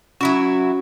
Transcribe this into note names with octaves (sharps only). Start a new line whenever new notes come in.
F#3 C#4 E4 F#4